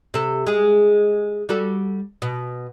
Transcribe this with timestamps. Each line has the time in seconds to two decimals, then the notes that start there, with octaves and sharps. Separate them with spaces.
0.14 C3 A4
0.47 G#3 G#4
1.49 G3 F#4 A4
2.22 B2